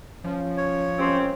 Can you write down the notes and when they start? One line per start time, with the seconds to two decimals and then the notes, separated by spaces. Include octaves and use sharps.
0.24 F3 C#4
0.57 C#5
0.99 C4 C#4 G4